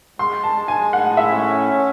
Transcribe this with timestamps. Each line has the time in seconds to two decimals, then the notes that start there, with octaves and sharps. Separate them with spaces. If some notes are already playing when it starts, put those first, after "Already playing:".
0.19 G#3 C6
0.44 A5
0.56 G#3
0.68 G#5
0.93 A2 F#5
1.17 E5
1.30 C#4